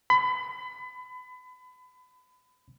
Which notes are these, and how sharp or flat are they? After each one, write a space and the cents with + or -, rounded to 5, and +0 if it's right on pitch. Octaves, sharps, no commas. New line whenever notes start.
B5 +30